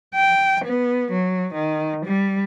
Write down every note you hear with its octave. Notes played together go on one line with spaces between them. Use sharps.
G5
B3
F#3
D#3
G3